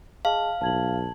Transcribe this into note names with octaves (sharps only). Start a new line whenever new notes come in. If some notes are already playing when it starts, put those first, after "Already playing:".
G#4 D#5 F5 A5
B1 A5 G#6 F#7